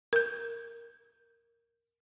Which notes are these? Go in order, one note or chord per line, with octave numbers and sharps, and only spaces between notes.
A#4 G6